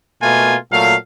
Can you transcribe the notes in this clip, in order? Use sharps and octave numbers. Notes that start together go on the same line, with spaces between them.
B2 A3 A#3 F4 G#5
A#2 F#3 A3 F5